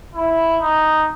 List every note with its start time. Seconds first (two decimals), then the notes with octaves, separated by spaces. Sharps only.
0.15 E4
0.61 D#4